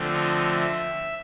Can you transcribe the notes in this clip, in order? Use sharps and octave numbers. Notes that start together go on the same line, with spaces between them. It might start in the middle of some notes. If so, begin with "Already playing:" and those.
Already playing: D3 F3 A3 C4
D#5
E5